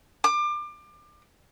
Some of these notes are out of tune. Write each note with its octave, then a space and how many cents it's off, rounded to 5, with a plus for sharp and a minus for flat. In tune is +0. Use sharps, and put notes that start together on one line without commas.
D6 +30